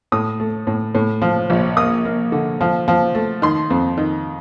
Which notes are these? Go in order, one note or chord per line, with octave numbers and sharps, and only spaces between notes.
A2 D#6
A3
A2
A2
F3
A#1
A#3 D#6
A#3
D3
F3
F3
A3
D#3 C6
F2
D#3